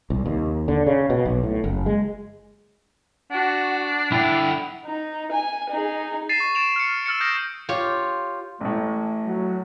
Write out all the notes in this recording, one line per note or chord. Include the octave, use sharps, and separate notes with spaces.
C2
D#2
D3
C#3
B2
B1
A2
F#1
G#3
D4 F#4 F#5
D3 E4 F#5 G5
D#4
G#5
D#4 G#4
A6 C7 D#7 E7
C#6
A6 D7 E7 F7
F6 C#7
E6 F6 A6 C#7
D#6 G6 A#6 D7
F4 G4 C#5
A1 A2 A3
F#3